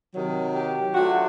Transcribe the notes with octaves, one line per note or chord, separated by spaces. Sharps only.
C3 D#3 F#3
G4
F#3 A3 D4 F4 F#4